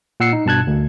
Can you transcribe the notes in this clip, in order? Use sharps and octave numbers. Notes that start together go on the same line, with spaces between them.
A#2 F#5 E6 C7 C#7
D#4
G2 B2 A5 F#6 G#6
D2